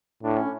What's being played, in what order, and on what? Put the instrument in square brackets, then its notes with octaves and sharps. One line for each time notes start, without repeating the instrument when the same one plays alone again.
[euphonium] A2 [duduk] D4
[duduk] C#4